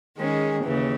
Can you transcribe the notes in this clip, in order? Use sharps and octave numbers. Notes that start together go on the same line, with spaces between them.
D#3 G#3 C#4 G#4
D#2 C#3 E3